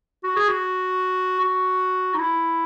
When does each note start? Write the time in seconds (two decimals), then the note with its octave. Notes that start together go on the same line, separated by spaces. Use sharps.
0.23 F#4
0.36 G#4
0.48 F#4
1.41 F#4
2.14 D#4
2.19 E4